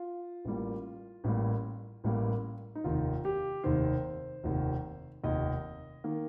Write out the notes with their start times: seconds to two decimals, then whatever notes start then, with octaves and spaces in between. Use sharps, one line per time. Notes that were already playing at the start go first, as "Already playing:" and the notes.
Already playing: F4
0.45 A1 A2 G3 A#3
1.24 A1 A2 G3 A#3
2.04 A1 A2 G3 A#3
2.75 D#4
2.84 F1 D#2 D#3 F4
3.25 G4
3.64 F1 D#2 D#3 C5
4.43 F1 D#2 D#3
5.24 F1 D#2 D#3 D#5
6.04 D#3 A#3